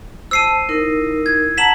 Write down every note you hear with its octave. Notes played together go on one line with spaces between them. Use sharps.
C5 A5 E6 C7 D#7
D#4 E4 A#4
G#6
F#5 A5 A#5 B6 E7 F#7